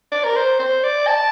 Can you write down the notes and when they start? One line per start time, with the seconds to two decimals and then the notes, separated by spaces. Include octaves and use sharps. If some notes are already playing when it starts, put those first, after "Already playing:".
0.12 D5
0.24 A#4
0.36 C5
0.59 C5
0.84 D5
1.07 A5